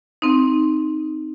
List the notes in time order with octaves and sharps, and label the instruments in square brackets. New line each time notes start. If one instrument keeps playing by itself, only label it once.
[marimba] C4 D#4